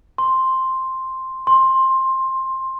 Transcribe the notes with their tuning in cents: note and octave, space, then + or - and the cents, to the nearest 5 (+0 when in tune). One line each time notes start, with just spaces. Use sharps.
C6 +5
C6 +15